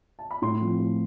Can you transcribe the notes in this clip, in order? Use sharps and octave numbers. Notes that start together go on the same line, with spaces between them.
A5
B5
A2 C6
F3 C4
A2